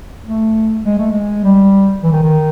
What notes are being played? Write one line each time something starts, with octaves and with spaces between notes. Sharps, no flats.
A3
G#3
A3
G#3
G3
E3
D#3
D#3